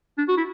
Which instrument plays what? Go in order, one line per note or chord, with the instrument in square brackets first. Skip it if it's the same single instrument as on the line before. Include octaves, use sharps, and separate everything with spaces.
[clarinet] D4
F#4
E4